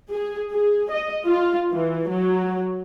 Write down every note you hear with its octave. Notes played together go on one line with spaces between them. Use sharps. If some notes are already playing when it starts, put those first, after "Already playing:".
G#4
G#4
D#5
F4
E3
F#3